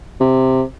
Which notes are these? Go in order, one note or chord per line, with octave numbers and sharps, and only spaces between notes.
C3